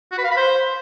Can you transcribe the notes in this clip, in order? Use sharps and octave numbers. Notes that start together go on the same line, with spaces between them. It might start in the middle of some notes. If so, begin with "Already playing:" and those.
F#4
B4
F5
B5
C5